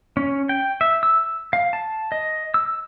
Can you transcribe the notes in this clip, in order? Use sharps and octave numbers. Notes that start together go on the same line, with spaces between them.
C#4
G5
E5
E6
F5
A5
D#5
E6